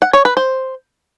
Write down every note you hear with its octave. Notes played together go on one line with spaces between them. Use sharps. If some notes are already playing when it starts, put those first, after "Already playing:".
F#5
C#5
B4
C5